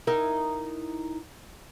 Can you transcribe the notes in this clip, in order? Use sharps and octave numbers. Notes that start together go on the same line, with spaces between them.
D#4 E4 A#4